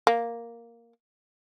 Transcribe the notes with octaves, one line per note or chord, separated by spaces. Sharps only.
A#3